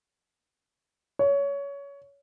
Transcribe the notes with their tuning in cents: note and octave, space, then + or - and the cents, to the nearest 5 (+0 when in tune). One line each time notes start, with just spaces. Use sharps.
C#5 +20